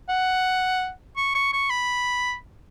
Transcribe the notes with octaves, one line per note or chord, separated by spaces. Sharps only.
F#5
C#6
C#6
C#6
B5